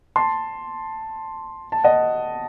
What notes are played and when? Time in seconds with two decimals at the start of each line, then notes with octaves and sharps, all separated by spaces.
0.16 A5 C6
1.72 A5
1.84 D#5 F#5